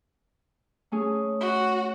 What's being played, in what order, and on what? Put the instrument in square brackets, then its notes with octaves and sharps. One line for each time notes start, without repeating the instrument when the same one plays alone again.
[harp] A3 C#4 G#4
[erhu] F#4